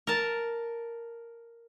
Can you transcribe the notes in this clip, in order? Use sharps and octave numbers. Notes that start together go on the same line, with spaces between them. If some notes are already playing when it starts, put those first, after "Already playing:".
A#4 A5